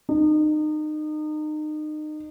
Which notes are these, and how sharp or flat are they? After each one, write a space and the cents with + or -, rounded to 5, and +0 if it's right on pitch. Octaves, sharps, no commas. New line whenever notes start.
D#4 -30